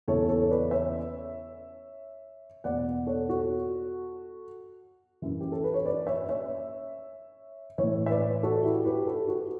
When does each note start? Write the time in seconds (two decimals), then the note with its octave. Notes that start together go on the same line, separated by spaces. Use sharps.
0.08 E2 C#3 E3 A4 C#5
0.28 A4 C#5
0.50 B4 D5
0.71 C#5 E5
2.64 E2 B2 D5 F#5
3.07 A4 C#5
3.29 F#4 A4
5.22 F#2 E3
5.40 G4
5.52 A4
5.64 B4
5.74 C#5
5.86 B4 D5
6.07 C#5 E5
6.29 C#5 E5
7.78 A2 E3 C#5 E5
8.06 E5
8.10 B4 D5
8.43 F#4 A4
8.64 E4 G4
8.85 G4 B4
9.06 F#4 A4
9.28 F#4 A4